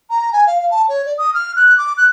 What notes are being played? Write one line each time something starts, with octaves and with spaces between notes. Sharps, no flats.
A#5
G#5
F5
F5
A5
C#5
D5
D#6
F6
F#6
D6
F#6